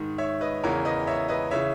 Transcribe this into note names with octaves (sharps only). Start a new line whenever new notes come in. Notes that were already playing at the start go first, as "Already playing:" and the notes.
Already playing: G#2 D#3
C#5 E5
B4 D#5
E2 C#3 E3 A#4 C#5
B4 D#5
C#5 E5
B4 D#5
C#3 E3 C#5 E5